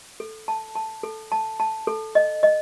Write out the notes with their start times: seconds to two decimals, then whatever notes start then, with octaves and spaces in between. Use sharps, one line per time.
0.20 A4
0.48 A5
0.75 A5
1.03 A4
1.32 A5
1.60 A5
1.87 A4
2.15 D#5
2.43 D#5